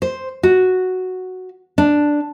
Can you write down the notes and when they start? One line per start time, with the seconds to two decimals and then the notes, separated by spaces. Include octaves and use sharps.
0.02 C5
0.43 F#4
1.78 D4